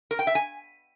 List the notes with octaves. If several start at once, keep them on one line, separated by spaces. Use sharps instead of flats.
A#4
G5
E5
G#5